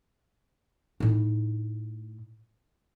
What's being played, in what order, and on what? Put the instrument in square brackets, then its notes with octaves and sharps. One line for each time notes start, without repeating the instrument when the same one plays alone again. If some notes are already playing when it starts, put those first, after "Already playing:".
[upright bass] A2 D#4